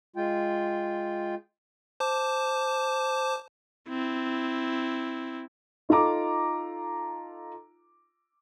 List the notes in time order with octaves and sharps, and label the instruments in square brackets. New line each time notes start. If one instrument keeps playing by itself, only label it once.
[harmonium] G#3 F4 G5
[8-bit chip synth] C5 A5 D6
[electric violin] C4 E4
[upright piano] D#4 F4 A4 A#5 D6